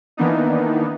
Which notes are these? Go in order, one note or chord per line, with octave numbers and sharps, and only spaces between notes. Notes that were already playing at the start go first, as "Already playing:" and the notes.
D#3 E3 A#3 B3 D4 D#4